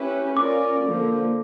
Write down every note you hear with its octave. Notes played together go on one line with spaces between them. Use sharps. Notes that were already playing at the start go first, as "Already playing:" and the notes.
Already playing: C#4 E4 G4 B4
C#4 F4 A#4 D5 D6
D3 F3 A#3